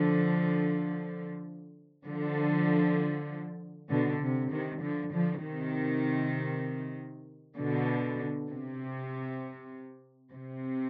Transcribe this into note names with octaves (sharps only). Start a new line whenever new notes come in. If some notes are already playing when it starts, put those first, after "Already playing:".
Already playing: D3 F3
D3 F3
B2 D3
C3
C3 D#3
D3 F3
D3 F3
C3 D#3
B2 D3
C3
C3